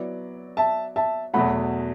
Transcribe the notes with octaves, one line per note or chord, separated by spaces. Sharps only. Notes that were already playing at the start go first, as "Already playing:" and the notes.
Already playing: F#3 B3 E4 D5
E5 A5
E5 A5
E2 B2 F#3 A3 F#5 B5